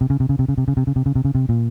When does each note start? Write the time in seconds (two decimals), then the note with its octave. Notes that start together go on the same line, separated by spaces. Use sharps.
0.01 C3
0.10 C#3
0.20 C3
0.29 C#3
0.39 C3
0.48 C#3
0.58 C3
0.68 C#3
0.77 C3
0.87 C#3
0.96 C3
1.06 C#3
1.15 C3
1.25 C#3
1.35 C3
1.49 A#2